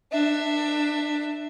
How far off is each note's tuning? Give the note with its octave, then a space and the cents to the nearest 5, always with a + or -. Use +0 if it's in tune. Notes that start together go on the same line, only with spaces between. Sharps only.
D4 +20 E5 +0